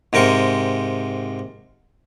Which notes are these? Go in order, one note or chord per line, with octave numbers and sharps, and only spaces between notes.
G#2 C3 A#4 G5 C#6